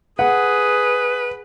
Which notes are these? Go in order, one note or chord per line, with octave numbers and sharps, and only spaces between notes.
G#4 B4 F#5